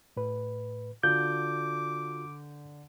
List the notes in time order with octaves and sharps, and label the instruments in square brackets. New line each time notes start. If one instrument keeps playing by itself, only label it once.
[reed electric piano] A2 B4
[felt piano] D3 [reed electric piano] F4 F#4 [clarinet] D6 [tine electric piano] G6